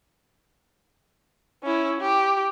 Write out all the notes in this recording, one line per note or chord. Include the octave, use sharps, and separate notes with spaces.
C#4 E4
G4